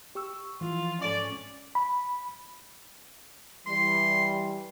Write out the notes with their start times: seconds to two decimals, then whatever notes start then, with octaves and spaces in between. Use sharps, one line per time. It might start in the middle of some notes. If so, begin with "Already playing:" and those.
0.15 G4 C#6 E6
0.61 E3 F3 F4
1.01 G#2 C#4 A4 D5 C#6
1.75 B5
3.66 E3 G3 C6